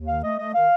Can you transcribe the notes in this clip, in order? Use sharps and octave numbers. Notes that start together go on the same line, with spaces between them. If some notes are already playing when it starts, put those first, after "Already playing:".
Already playing: D#2
D#3 F5
A3 D#5
A3 D#5
D#3 F5